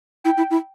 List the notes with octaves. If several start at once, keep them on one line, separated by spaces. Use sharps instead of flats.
E4 G5
E4
E4